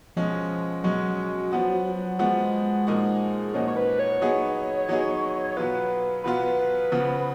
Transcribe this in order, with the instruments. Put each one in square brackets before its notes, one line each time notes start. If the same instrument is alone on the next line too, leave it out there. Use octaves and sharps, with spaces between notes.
[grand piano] B2 G#3 C#4 [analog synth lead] F3
[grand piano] B2 G#3 C#4 [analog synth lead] F#3
[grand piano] F3 B3 F#4
[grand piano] F3 B3 F#4 [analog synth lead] G#3
[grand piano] A#2 F3 A#3 D#4 F#4
[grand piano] A#2 F3 A#3 D#4 F#4 [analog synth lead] C#4
[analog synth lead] C#5
B4
C#5
[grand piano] F#3 B3 D#4 G#4
F#3 B3 D#4 G#4
[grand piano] B2 F#3 B3 F4 [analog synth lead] B4
[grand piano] B2 F#3 B3 F4 [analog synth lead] B4
[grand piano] C#3 F3 B3